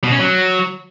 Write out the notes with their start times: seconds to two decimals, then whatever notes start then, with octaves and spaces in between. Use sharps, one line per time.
0.04 B2
0.12 C#4
0.20 F#3